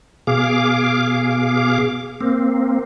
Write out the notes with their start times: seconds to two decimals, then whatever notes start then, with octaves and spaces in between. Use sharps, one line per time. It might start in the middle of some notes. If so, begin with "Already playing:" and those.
0.27 B2 G#4 F5 D6
2.21 A#3 C4